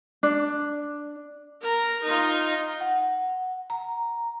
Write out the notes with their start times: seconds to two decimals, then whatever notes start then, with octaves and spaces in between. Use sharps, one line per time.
0.23 D4
1.62 A#4 A#5
2.03 D#4 F4
2.81 F#5
3.70 A#5